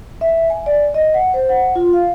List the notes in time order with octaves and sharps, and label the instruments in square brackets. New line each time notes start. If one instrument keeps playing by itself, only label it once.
[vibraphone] E5
G#5
D5
D#5
F#5
C5
F#5
F4
F5